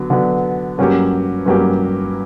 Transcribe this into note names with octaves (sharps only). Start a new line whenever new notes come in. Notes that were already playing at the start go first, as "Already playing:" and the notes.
Already playing: D3 F#3 B3
D3 F#3 B3
G2 F#3 A#3 C#4 G4
G2 F#3 A#3 C#4 G4